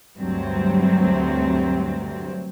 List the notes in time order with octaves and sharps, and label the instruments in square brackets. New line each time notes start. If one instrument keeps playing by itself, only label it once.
[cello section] D2 G2 C3 F#3 C4